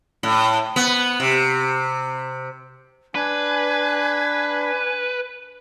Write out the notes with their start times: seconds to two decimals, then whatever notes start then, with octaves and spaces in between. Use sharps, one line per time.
0.23 A2
0.76 B3
1.20 C3
3.15 D4 B4 G#5